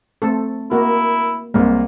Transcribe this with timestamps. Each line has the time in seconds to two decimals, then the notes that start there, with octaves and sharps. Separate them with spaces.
0.22 A3 C4 A4
0.71 A#3 E4 F#4 A#4
1.54 C2 G#3 A#3 C4